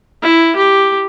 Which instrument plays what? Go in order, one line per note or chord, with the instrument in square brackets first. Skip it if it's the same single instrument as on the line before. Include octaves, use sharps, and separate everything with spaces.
[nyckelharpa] E4
G4